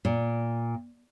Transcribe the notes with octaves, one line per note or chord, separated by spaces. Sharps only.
A#2